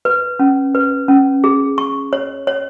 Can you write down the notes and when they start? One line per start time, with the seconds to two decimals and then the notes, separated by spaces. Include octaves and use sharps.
0.05 B4
0.39 C#4
0.75 B4
1.08 C#4
1.44 G#4
1.78 C#6
2.13 C#5
2.47 C#5